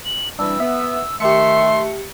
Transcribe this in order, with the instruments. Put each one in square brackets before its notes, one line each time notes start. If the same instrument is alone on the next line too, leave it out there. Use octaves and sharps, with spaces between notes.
[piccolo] F#7
[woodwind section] E3 G3 C4 [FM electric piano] D4 [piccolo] E6
[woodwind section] B3 [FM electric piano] E5
[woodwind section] D#3 E5 [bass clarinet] A3 [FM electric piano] G4 C#7 [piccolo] C6